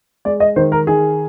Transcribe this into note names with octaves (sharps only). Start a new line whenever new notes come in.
G#3 D5
D#5
D#3 C5
A#4
D#3 G#4